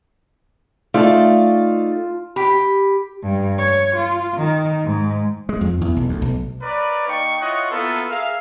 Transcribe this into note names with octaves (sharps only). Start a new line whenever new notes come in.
A3 D#4 F4 D5 A5
G4 B5 B6
G2
C#5
F4
D#3
G#2
G#3
F2
E2
B1
D2
B1
A#4 B4 C#5 D5
A#3 D#4 G5 C#6
E4 F4 C#5 D#5 F#5 C#6
A#3 B3 E4 F4 A4 A#4
G#4 A#4 E5 F5